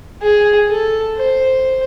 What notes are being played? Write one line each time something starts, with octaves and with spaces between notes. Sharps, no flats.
G#4
A4
C5